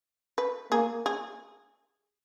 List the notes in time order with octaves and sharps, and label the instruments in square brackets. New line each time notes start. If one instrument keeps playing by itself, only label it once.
[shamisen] B4
[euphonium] A#3 [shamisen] G#4
[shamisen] G#4